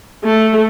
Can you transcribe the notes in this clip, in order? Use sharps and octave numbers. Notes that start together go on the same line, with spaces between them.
A3